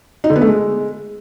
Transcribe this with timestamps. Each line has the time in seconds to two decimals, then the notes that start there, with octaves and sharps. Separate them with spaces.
0.24 D#4
0.30 D3
0.36 B3
0.41 A3
0.47 G#3